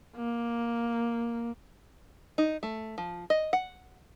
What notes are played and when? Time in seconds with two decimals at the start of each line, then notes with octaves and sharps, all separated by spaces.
0.16 A#3
2.38 D#4
2.63 A3
2.98 F3
3.30 D#5
3.53 F#5